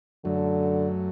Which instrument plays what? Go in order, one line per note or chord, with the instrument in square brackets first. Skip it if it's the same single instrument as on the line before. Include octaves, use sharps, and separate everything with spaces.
[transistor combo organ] F#2 F#3 A3 [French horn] D3